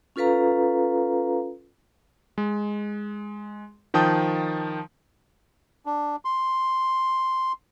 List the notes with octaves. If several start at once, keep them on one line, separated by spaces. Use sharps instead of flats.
C#4 F4 A4 B4 F5 A#5
G#3
D#3 F3 G5 A5 D#6 G6
D4
C6